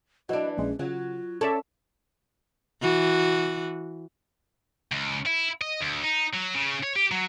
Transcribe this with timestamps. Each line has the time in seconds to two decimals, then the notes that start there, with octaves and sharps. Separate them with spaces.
0.29 E3 F#3 D4 D#5
0.57 A#1 G#3 C#4
0.79 C#3 F#3 F4
1.41 C#4 A4 C#5 D5 E5
2.82 E3 F#4
4.92 C#2
5.26 E4
5.61 D#5
5.81 D2
6.04 D#4
6.33 F#3
6.54 C#3
6.83 C#5
6.96 G4
7.11 F#3